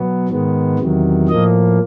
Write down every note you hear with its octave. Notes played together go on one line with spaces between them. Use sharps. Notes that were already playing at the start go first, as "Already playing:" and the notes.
Already playing: B2 F#3 B3
G#2 D#3 G#3 B3
E2 C3 D#3 F#3
A2 F3 A#3 D#5